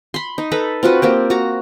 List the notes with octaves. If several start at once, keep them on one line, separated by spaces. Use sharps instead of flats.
B5 C6
D#4
A4 B4 A#5 B5
C4 F4 F#4 B4
A#3 C4 G4
F#4 A#5